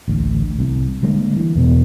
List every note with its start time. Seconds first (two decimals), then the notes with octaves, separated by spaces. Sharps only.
0.08 A1 D2
0.59 C2
1.03 D3 G3 G#3 A#3
1.36 E3
1.55 E2 B2 B3